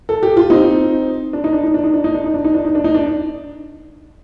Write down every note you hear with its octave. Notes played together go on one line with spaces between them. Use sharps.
A4
G4
F4
C4 D#4
D4
D#4
D4
D#4
D4
D#4
D4
D#4
D4
D#4
D4
D#4
D4
D#4
D4
D#4
D4